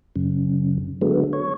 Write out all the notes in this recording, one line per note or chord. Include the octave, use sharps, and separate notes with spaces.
F#2 C#3
D3 F#3 G#3 A3 B3
C#5